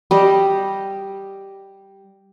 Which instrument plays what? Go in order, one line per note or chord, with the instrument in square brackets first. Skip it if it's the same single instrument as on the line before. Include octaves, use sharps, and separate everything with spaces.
[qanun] G3 D#5